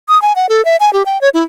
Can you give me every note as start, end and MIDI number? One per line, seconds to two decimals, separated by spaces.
0.09 0.20 87
0.22 0.33 80
0.36 0.49 78
0.49 0.64 69
0.65 0.76 76
0.80 0.92 80
0.93 1.03 67
1.06 1.20 79
1.21 1.29 73
1.34 1.43 64